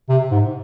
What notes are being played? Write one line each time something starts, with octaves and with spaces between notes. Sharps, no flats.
C3
G#2